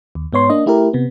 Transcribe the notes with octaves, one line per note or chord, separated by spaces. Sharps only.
D#2
G#2 B3 C#5 C6
A#3 D4 D#5
A3 E4 G4 A#4
C3 B3